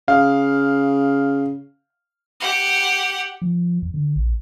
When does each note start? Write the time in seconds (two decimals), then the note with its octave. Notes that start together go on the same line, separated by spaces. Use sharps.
0.08 C#3 F5
2.40 G4 F#5
3.42 F3
3.82 E2
3.94 D3
4.16 A#1